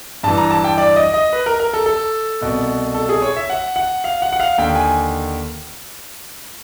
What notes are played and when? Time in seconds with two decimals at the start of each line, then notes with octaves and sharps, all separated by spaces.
0.23 G2 E3 A5
0.37 A#5
0.51 A5
0.64 G5
0.78 D5
0.96 D#5
1.14 D#5
1.33 B4
1.46 A#4
1.60 A#4
1.73 A4
1.86 A4
2.41 C2 B2
2.94 A4
3.09 G#4
3.22 C#5
3.36 E5
3.50 F#5
3.76 F#5
4.04 F5
4.22 F#5
4.32 F#5
4.40 F5
4.58 D#2 D3 G5
4.76 G#5